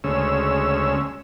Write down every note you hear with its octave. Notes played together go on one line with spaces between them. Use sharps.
D2 C#3 G#3 C#4 E6